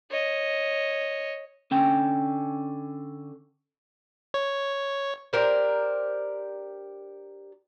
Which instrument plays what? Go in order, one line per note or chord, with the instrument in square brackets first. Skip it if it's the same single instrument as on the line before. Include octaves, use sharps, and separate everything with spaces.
[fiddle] C#5 D#5
[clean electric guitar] D3 C#4 G5
[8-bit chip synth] C#5
[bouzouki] D4 G4 A#4 C5